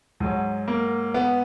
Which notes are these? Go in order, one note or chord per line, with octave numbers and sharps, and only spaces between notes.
G#2 F#3
A#3
B3